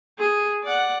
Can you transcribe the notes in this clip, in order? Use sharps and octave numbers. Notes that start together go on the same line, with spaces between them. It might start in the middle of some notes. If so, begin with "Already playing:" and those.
G#4
D5 F#5